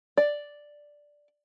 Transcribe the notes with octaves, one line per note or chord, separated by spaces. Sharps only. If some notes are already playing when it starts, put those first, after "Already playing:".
D5